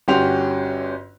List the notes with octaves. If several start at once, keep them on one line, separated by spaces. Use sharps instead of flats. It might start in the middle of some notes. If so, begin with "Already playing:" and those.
G1 C#4 F#4 G4 C6 F7